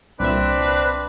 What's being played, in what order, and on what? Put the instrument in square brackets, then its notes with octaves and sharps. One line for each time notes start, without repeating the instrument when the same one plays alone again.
[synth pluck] C2 A#2 E5 [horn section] C4 D4 [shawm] B4